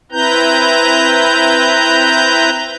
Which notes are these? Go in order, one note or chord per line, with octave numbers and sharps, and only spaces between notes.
C4 E4 B4 A#5 G6